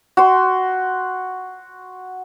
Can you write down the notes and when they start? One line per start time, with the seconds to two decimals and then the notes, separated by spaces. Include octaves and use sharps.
0.17 F#4 C6